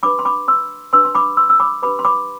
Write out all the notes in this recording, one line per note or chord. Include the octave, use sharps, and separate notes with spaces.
D4 G4 B4 B5 D6
C6
B5 D6
C6 E6
D4 G4 B4 C6 E6
C6
B5 D6
C6 E6
E6
B5 D6
D4 G4 B4 B5 D6
C6
B5 D6